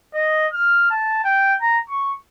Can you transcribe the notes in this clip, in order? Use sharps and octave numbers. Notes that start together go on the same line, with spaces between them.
D#5
F6
A5
G5
A#5
C#6